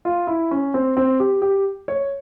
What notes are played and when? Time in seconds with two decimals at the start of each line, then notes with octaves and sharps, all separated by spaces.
0.05 F4
0.27 E4
0.51 C#4
0.74 C4
0.97 C4
1.20 G4
1.42 G4
1.88 C#5